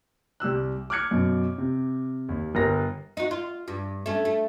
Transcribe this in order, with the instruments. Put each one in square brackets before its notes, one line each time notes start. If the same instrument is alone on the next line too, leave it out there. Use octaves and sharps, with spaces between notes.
[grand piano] C2 G4 E6 F#6
D6 F6 F#6 G#6 C#7
F#2 B2
C3
D#2
G1 A#4 A#6
[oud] D#4 F#4
F4
G2
A3 C#4
A3